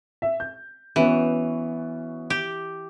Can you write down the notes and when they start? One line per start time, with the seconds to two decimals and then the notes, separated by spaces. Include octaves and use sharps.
0.22 E5
0.40 G6
0.96 E3 B3 C#4 F#4
2.30 G4